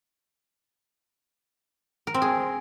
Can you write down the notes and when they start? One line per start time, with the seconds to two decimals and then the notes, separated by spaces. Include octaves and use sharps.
2.07 A#4
2.14 C4
2.22 G#4